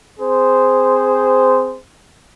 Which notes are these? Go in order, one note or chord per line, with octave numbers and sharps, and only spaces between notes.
C4 G#4 C5